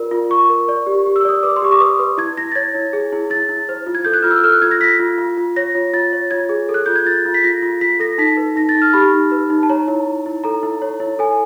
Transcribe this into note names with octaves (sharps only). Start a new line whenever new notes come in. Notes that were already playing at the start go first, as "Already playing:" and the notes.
Already playing: F4 A#4 D5
F4
F4 C#6
A#4
D5
G4
G4
E6
D5 D#6
B4 D6
C6
G4 C#6
D6
B4 D#6
B4
E4 G#6
E4 A#6
A6
C#5 G#6
E4
G#4
E4
E4 A6
E4
C5
F4
G#6
A4 G6
F#6
F4 F6
E6
A4 F6
F#6
F4 G#6
A#6
F4 B6
F4
F4
F4
C#5 A#6
F4
F4 A6
C#5
F4 G#6
G#4
A4
F#6
F4 G6
G#6
F4 A6
F4
B6
F4 A#6
F4
F4 B6
A4 A#6
D#4 B6
B4
D#4 A#6
A6
D#4
F6
G4 B5
D#4
B4
D#4
A5
C#5 A#5
E4
E4
E4
A4 A#5
E4
C#5
E4
A4 G#5